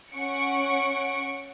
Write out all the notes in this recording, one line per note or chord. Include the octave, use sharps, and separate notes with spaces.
C#4 F#5 C#6 C#7 D7